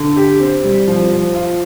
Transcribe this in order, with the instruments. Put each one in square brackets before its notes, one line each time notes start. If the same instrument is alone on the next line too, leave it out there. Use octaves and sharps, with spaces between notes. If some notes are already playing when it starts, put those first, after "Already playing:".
Already playing: [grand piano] D3
G4
C4
G3
F3
F3
F4